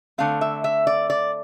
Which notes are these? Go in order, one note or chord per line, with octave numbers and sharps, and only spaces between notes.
D3 A3 C4 F5
E5
E5
D5
D5